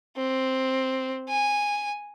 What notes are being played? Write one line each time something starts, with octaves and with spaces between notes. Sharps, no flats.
C4
G#5